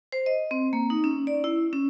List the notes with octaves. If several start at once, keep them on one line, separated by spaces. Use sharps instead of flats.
C5
D#5
C4
A#3
D#4
C#4
D5
E4
C#4